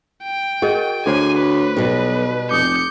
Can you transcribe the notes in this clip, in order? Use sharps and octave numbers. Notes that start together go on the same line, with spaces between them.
G5
F#4 G#4 A#4 D#5
D2 A4 C5 C#5 G#5
B4
B1 B2 G3
F1 D6 D#6 G6 C#7